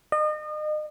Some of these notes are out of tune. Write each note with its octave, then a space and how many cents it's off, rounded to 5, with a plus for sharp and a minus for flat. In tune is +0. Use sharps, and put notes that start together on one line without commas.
D#5 -35